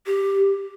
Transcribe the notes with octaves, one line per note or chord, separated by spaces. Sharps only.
G4